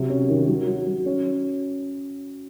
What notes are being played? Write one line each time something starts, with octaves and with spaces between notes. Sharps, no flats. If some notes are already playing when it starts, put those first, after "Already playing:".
Already playing: C3 F#3
C#4
D#3
F#3
F#3
F#3
C#4